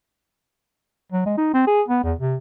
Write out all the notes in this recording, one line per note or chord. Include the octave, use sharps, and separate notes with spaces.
F#3
G#3
D#4
C4
G#4
B3
E2
C3